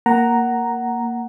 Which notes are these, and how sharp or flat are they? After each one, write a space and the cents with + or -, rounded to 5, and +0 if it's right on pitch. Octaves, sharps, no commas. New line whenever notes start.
A#3 +0 F#5 +10 A#5 +0